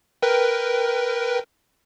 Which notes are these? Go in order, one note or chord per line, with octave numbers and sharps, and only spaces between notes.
A#4 B4 G5